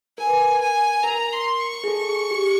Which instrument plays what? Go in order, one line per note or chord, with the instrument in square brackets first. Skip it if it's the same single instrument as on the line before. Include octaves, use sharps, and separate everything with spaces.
[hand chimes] A#4 [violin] G#5
[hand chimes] B4
A#4
[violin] G#5
[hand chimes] A#4 [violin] A#5
[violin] C6
C#6
[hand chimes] G#4
A4
G#4
G4